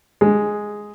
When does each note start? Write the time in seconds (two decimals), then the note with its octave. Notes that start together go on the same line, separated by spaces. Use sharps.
0.21 G#3